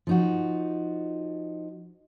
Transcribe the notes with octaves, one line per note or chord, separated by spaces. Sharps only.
F3 D#4 F#4